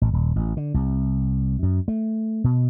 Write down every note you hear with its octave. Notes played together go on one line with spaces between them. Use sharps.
A1
D#1
A1
D3
C2
F#2
A3
B2